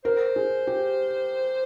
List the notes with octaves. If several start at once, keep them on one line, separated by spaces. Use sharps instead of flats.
A#4 C5
G#4
G4